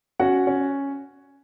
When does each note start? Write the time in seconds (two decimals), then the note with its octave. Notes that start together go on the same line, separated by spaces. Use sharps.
0.19 C#4 F#4 F#5
0.47 C#4